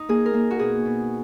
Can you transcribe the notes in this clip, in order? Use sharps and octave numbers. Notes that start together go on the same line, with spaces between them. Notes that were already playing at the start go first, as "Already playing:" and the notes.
Already playing: D#4
A#3 G#4
A#4
A#3
F#4
B2 G#4
B2